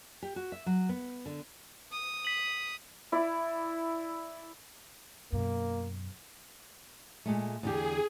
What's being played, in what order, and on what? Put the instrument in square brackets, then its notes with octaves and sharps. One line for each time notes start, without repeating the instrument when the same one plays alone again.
[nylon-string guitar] G4
F#4
E5
F#3
B3
D3
[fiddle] D#6
[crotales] B6 F#7
[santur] E4 D5
[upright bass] F#2 B2 [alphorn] A#3
[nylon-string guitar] A#2 G#3 A3
[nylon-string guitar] E2 D3 G4 [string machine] G#4